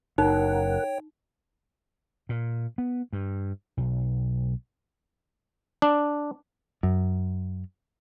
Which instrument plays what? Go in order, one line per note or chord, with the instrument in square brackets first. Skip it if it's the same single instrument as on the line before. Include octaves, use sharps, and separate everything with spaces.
[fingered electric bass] F#1 [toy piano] D#4 [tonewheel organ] A#4 F#5 [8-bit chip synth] C#5 G5
[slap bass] A#2
B3
G2
B1
[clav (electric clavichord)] D4
[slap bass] F#2